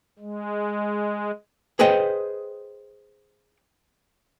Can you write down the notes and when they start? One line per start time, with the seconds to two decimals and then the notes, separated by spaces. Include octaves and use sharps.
0.19 G#3
1.79 G#4 B4 C5 D#5 G5